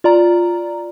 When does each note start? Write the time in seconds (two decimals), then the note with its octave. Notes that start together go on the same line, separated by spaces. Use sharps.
0.04 F4 D5 A#5